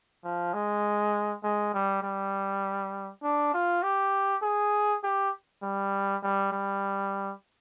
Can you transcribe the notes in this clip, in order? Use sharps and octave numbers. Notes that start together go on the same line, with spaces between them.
F3
G#3
G#3
G3
G3
D4
F4
G4
G#4
G4
G3
G3
G3